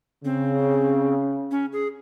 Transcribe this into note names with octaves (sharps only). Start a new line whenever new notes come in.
C#3 C4
C#4
G#4